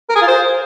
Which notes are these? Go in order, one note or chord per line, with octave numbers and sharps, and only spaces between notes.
A#4
G#4
F4
C5